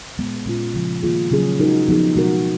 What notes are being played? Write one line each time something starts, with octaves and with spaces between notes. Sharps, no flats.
A#2 G#3 B3
A#2 G#3 C#4 F4
C#3 F3 G#3
D#3 A#3 F4 G#4
C#3 F#3 C#4 G#4
G#3 D#4 F#4 A#4
F3 B3 D#4 G#4
B2 G#3 B3 F#4 A#4